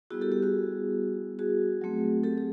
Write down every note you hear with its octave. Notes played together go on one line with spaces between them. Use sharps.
G3 B3 E4 F#4 G#4
G4 A4
G4
F#4 G#4
F#4 G#4
F#3 A3 C4
G4 A4
G#4